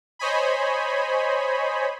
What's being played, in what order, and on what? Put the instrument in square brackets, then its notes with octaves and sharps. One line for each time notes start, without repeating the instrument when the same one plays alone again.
[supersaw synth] C5 C#5 D#5 G#5 B5